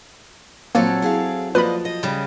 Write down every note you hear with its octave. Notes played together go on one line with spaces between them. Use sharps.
F#2 A#2 F3 F#3 A#3 C4 A4 C#5
E4 G#4 F5
F3 A#3 B4 D5 D#5 B5
D#5
C#3 G3